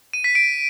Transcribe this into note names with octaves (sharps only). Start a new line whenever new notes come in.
D#7
B6
D7